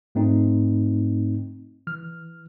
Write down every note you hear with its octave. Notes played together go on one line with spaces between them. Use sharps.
G#2 A3 C4 D#4
E3 F6